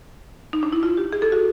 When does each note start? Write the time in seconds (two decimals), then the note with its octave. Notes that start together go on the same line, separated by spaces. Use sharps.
0.53 D#4
0.63 D4
0.73 E4
0.83 F4
0.97 G4
1.13 G#4
1.22 A4
1.32 F#4